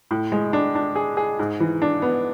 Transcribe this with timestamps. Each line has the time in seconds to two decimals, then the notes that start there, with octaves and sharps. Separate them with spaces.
0.11 A2
0.32 G#3
0.53 D4
0.75 D4
0.96 G#4
1.17 G#4
1.39 G#2
1.60 E3
1.82 D4
2.02 B3